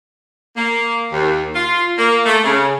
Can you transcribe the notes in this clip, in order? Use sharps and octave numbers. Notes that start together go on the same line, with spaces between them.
A#3
D#2
F4
A#3
A3
C#3